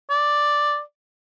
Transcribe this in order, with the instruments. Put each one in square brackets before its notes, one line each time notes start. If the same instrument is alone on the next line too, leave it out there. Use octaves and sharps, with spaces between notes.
[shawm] D5